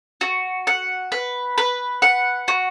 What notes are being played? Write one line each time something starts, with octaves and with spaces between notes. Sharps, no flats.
F#4
F#5
B4
B4
F#5
F#4